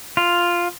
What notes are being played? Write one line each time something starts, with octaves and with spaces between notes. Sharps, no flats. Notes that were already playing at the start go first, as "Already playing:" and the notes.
F4